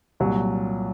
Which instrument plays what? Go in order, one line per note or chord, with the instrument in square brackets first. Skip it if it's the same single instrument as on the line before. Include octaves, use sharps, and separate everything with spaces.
[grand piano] C2 A#2 F#3